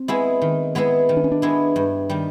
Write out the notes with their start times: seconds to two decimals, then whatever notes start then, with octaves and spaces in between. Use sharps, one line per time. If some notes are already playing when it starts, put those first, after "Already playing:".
Already playing: C4
0.08 G#3 B3 E4 G#4
0.42 D#3
0.75 G#3 B3 E4 G#4
1.09 D#3
1.17 D4
1.24 C#4
1.32 D4
1.42 G#3 B3 E4 G#4
1.76 G2
2.10 D#3 G3